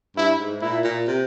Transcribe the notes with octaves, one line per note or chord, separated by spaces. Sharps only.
G2 E4
G#2
A#2 E4
A#2
C3